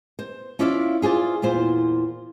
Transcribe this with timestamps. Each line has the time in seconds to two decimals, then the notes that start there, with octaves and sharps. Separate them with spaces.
0.19 C5
0.59 C#4 E4 F4 D5 E5 F5
1.02 F4 G#4 C5 D5
1.42 E2 A#2 F4 C5